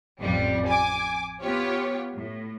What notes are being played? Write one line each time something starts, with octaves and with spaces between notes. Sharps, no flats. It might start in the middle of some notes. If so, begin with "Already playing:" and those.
A1 F2 G3
G#5 D6
B3 F4 G4 C#5
A2